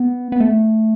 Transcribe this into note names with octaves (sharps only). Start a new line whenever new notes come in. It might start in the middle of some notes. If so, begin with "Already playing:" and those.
Already playing: B3
B3
A3